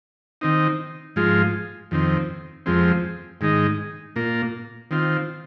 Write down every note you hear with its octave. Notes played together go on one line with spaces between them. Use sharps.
D#3 C4 D#4
G#2 F3 G#3 F4
F2 D#3 C4
F2 F3 G#3 C4
G#2 D#3 G#3 D#4
A#2 A#3 F4
D#3 C4 F4